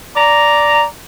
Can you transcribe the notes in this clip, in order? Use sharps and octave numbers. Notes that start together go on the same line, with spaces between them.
D5 A#5